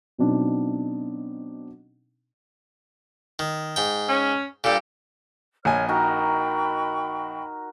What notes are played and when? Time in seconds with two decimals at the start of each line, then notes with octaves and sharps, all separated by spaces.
0.18 B2 F#3 C4 D4 D#4
3.39 D#3
3.76 G#2 G5
4.09 C#4
4.64 G2 A#2 G4 A4
5.65 A#1 C#5 D#5 G#5 F6
5.89 D#4 F#4 A#4 G5 B5 C#6